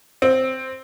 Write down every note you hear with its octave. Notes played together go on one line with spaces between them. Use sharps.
C4